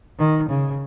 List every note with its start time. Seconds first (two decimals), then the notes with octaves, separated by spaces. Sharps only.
0.19 D#3
0.49 C#3